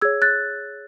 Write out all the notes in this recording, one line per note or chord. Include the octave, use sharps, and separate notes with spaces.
G#4 C#5 E6 G#6
F#6 A6